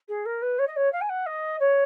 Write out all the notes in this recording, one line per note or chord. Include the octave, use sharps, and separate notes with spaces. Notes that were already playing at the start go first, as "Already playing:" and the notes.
G#4
A#4
B4
C#5
D#5
C#5
F5
G#5
F#5
D#5
C#5